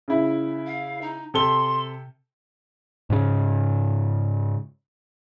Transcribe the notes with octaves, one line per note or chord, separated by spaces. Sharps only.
C#3 E4
F5
D#4
C3 A4 C6 G7
G#2 C#3